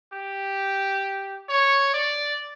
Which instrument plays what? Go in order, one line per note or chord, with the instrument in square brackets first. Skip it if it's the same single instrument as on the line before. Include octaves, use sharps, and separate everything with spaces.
[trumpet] G4
C#5
D5